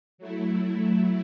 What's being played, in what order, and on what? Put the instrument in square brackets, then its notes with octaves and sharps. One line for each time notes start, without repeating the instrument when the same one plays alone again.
[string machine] F#3 A3 E4